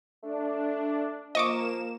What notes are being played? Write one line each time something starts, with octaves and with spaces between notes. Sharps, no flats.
A3 D4
F3 A#3 D#5 C#6 D6 E7